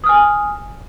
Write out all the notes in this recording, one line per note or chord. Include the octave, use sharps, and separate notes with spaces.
G#5 D#6 F6